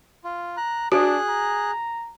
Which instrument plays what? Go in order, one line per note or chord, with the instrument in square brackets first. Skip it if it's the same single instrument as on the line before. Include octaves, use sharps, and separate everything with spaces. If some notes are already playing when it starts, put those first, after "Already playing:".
[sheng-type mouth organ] F4
[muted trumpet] A#5 [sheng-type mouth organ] F#6
[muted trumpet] D4 [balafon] F#4 [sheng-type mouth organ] G#4 F#6
[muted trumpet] A#5